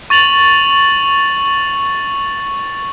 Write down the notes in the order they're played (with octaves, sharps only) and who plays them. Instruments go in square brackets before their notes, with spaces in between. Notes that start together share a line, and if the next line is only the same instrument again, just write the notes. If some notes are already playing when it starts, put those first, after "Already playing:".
[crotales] C#6 A6 F7 F#7